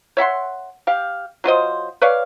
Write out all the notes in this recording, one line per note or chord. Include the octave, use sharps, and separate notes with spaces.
C#5 E5 F#5 C6
G4 F5
F#3 F4 C5 D#5
B4 C#5 D5 F5